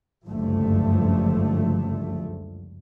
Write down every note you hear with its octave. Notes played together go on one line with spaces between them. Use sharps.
F#1 C#2 G2 D3 F3 A3